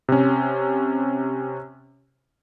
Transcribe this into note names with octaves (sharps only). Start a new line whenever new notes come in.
C3 C#4